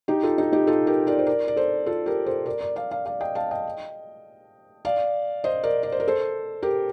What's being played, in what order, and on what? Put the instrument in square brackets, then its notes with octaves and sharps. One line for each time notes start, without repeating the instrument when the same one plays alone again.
[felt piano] D#4 G4
F4 A4
D#4
D#4 G4
F4 A4
G4 A#4
A#4 D5
C5
A#4 D5
D5
A4 C5
F4 A4
G4 A#4
A4 C5
A#4 D5
A#4 D5
D5 F5
D5 F5
D5 F5
D#5 G5
F5 A5
D#5 G5
D5 F5
C5 D#5
A#4 D5
D5
C5
A#4
A4 C5
G4 A#4